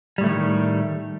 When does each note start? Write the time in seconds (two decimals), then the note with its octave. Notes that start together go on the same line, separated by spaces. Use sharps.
0.18 G3
0.21 A2
0.24 A3
0.26 E3
0.29 D#3